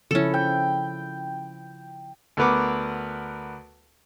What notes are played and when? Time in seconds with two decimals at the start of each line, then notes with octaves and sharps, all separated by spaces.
0.11 C#3 F3 C#4 E4 A4
0.34 G5
2.37 D2 B3 A#4 B4 F#5 D6